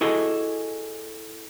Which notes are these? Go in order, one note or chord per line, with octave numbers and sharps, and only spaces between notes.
E4 F#4 G#4 A4 D#5